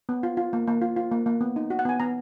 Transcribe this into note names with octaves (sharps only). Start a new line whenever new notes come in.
B3
F4
F4
A#3
A#3
F4
F4
A#3
A#3
B3
D#4
F#4
F#5
B3 G#5
B3 A#5